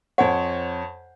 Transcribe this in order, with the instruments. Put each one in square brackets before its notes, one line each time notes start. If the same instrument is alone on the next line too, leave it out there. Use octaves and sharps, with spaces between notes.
[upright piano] F2 C5 C#5 [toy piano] F#5 G#5